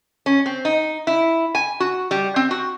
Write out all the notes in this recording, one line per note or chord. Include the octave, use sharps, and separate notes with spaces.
C#4
C4
D#4
E4
G#5
F#4
G3
C4
F#4